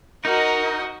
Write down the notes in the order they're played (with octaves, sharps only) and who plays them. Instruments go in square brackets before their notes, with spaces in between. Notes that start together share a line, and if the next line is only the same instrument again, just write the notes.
[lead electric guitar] D#4 [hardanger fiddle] F#4 D#5 [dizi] A#4